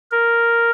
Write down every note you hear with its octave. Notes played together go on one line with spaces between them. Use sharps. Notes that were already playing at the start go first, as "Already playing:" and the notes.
A#4